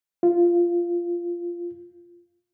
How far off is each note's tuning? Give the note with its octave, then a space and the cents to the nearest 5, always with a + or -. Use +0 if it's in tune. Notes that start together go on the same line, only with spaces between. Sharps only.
F4 -10